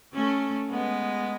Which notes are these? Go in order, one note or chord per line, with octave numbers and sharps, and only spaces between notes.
A3 C#4
G#3 B3